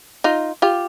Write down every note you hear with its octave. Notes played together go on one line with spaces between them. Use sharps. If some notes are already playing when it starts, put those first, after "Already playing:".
D#4 F4
F4 G4